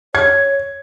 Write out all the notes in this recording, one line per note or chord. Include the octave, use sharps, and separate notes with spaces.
C#5 G#6